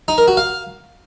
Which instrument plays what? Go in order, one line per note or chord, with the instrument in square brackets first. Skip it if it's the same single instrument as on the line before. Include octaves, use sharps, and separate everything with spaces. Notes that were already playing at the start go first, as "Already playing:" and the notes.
[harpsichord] D#4
A#4
F#4
F5